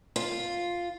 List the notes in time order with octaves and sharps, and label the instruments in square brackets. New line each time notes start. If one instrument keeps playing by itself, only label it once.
[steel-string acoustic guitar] F4